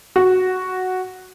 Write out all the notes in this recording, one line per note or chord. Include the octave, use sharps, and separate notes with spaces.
F#4